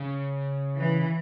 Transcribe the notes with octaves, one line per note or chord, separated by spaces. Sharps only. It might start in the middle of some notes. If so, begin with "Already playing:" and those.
Already playing: C#3
E3